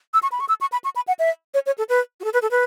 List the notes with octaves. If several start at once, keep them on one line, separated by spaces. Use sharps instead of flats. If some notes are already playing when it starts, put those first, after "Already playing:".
E6
C#6
B5
C#6
E6
C#6
B5
C#6
B5
F#5
E5
C#5
C#5
A4
B4
F#4
A4
B4
A4
B4